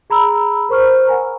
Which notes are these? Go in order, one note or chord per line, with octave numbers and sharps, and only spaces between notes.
G#4 A#5 B5 E6
A#4 C5 C#6 F6
F#5 G#5 A#5